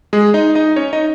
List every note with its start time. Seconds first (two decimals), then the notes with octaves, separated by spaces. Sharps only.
0.13 G#3 G#4
0.34 D#4 D#5
0.55 D#4 D#5
0.76 C#4 C#5
0.93 D#4 D#5